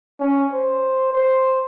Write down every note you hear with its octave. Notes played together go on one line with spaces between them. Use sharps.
C#4
C5
C5